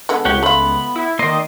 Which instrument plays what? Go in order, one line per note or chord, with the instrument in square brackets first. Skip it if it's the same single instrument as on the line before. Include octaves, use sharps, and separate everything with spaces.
[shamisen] D3 G#3 B3
[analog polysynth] C#2 [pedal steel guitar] G4 C#5 F#5
[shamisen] A3 F4 [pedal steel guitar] B3 B5
[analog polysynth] E4
[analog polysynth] D#3 D#5 [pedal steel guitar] A#3 D5 C6